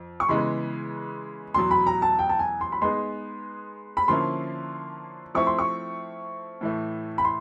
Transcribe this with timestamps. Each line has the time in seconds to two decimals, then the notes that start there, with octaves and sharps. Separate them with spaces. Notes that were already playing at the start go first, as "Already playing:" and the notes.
Already playing: F2
0.20 C#6
0.29 C#3 E3 G#3 B3 C6
1.54 E2 B2 F#3 C6
1.71 B5
1.87 A#5
2.02 A5
2.19 G5
2.29 A5
2.39 G#5
2.61 C6
2.72 B5
2.81 G#3 B3 D#4 G#4 C6
3.97 B5
4.08 D3 F3 A#3 C#4 E4 C6
5.35 F3 A3 C4 E4 C#6
5.47 C6
5.59 C#6
6.61 A2 E3 A3
7.18 B5
7.25 C6